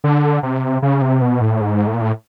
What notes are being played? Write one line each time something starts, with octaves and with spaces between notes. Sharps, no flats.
D3
C3
C#3
C3
B2
A2
G#2
A2
A#2
A2